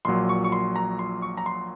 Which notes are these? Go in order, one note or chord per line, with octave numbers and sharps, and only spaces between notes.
A#1 A#2 F#3 C6
C#6
C#6
C6
A#5
C6
C#6
A#5
C6